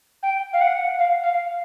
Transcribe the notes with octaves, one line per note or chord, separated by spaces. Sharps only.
G5
F5
F#5
F5
F5